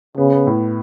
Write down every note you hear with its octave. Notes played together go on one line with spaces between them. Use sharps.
C#3 B3
B3
A2